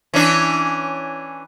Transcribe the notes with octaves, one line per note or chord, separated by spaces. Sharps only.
E3 C#4 D4